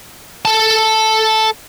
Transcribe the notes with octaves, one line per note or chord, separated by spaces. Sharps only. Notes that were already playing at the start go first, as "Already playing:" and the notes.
A4 A5